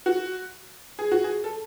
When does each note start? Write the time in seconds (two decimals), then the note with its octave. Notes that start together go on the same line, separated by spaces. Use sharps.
0.06 F#4
0.99 G#4
1.12 F#4
1.24 G#4
1.44 A4